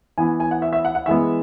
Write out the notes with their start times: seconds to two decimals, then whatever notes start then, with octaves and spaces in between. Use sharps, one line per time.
0.18 E3 B3 G#5
0.40 G#5
0.51 F#5
0.62 E5
0.73 E5
0.85 F#5
0.95 F#5
1.06 E3 G#3 B3 E5